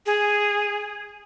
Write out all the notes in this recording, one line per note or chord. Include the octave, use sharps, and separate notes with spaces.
G#4